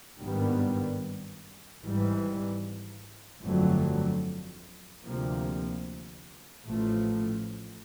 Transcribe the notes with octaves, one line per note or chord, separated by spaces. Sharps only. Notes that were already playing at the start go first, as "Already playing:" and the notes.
G#1 G2 D#3 G3 B3
G#1 G#2 E3 G3
G1 F2 D3 F#3 A3
D2 C3 F3 A#3
A1 A2 F3 A3